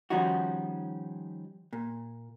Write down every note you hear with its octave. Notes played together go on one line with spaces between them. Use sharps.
D#3 F3 G3 C#4 D#4 F#4
A#2